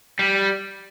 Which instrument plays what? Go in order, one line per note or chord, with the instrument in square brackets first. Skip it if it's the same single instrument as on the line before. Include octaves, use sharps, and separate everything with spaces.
[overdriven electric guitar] G3